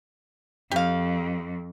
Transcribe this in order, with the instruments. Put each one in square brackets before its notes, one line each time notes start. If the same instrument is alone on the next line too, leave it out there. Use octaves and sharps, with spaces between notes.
[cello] F2 [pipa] G4 F5